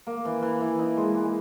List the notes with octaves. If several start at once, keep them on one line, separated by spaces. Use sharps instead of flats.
A#3
E3
E3
E3
D#4
G#3
G#3